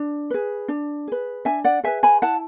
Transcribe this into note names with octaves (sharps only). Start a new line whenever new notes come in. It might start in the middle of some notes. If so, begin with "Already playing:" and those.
Already playing: D4
G#4 B4
D4
G#4 B4
D4 E5 G#5
D5 F#5
G#4 B4 E5 G#5
G#5 B5
E4 F#5 A5